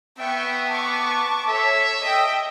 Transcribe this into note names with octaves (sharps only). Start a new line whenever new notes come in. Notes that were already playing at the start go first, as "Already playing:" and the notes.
B3 E5 G5 C#6
A5 C#6 D6
A4 C#5 E5
D#5 G5 D#6